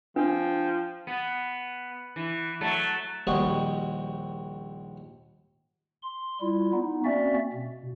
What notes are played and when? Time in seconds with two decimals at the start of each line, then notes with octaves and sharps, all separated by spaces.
0.16 F3 D4 G5
1.07 B3
2.16 E3
2.61 F#3 A3
3.27 A#1 D#2 G3 F#4 D#5
6.02 C6
6.41 G3 E4 F4
6.73 B3 D#4
7.04 A#3 C4 C#4 F#4 D5 E5
7.53 B2